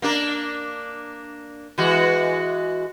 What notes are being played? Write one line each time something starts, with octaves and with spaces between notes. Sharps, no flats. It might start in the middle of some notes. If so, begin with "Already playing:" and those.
A#3 D4 A#4
E3 G#3 F#4